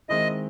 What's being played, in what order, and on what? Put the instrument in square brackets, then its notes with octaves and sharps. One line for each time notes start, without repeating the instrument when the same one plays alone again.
[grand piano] D#3 G#3 C4 E4 [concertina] D#5